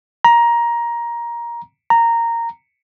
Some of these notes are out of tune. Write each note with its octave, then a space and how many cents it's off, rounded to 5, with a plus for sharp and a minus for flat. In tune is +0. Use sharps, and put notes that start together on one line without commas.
A#5 +15
A#5 -10